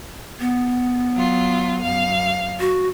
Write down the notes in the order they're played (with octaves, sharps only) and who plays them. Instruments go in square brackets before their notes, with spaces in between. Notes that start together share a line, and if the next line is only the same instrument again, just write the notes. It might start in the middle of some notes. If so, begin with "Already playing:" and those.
[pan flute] B3
[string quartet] F#3 F4
F#2 F5
[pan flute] F#4